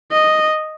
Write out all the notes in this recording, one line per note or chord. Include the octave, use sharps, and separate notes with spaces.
D#5